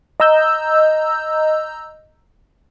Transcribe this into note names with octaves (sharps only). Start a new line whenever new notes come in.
D#5 A#5 E6 G6